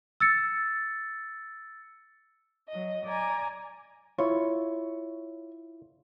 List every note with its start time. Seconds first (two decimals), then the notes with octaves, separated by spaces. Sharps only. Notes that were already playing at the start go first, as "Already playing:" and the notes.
0.20 E6 A6 C#7
2.68 F#3 D#5
3.05 D5 G#5 A#5
4.18 E4 F4 C#5